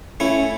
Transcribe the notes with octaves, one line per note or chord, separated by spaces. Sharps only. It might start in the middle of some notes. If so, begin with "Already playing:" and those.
A3 C#4 E4